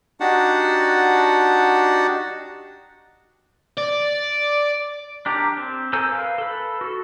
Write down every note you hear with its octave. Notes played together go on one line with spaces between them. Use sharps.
D4 D#4 F#4 G4 F#5 A5
D5
D4 G4 A#4
C4
A4 A#4 C5 G#5 E6
A#4 B4 F5
A4 B4
F#4 A4